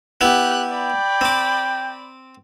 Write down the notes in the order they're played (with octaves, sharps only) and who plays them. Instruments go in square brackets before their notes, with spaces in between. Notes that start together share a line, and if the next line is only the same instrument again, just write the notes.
[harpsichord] B3 E4 [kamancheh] G4 F#6
[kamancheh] D5 B5 [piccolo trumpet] G5
[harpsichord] C4 D6